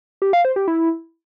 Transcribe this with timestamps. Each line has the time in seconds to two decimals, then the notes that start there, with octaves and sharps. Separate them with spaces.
0.22 G4
0.33 F5
0.45 C5
0.56 G4
0.68 E4